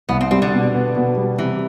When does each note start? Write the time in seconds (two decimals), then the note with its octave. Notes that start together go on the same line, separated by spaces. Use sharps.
0.09 C2 B3
0.21 C4
0.31 G3 C4
0.42 D3
0.53 B2
0.74 B3
0.96 B2
1.17 G3
1.38 C3 E3